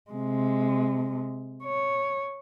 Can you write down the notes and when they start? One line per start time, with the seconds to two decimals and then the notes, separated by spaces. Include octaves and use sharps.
0.11 C3 G#3
1.64 C#5